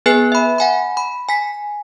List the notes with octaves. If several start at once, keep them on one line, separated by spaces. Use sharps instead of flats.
B3 G#4 B4 G#5 F#6 C7
E5 B5
F#5 G#5 B5
B5
G#5 B6